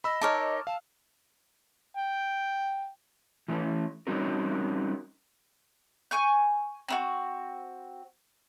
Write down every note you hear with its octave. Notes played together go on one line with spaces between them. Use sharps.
D#5 B5 E6
D#4 A#4 C#5 A5 D6 F6
F5 A5
G5
E3 A3 C#4
G3 C4 C#4 D#4 F#4 A#4
G#5 C#6 G6
C4 D#4 F#4